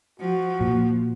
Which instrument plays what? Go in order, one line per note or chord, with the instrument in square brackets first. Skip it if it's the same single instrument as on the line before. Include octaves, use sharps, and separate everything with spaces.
[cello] F3 [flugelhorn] F#4
[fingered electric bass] A#2